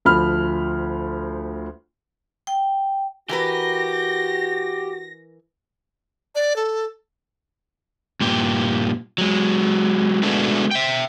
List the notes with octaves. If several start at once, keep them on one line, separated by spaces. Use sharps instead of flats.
D2 F3 B5 F6
G5
E3 F#4 G4 A#4 B4 A#6
D5
A4
G2 A#2 G4
F#3 G#3
G#3 A3 B3 D4 F#4 G#4
E5 G5